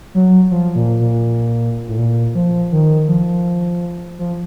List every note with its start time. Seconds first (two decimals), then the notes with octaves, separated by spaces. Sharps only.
0.14 F#3
0.51 F3
0.75 A#2
1.00 A#2
1.88 A2
1.98 A#2
2.35 F3
2.72 D#3
3.08 F3
4.19 F3